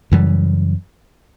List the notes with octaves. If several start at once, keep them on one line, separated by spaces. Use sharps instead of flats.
F#2 C#3 E3 G3